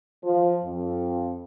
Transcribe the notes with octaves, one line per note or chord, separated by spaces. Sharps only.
F3
F2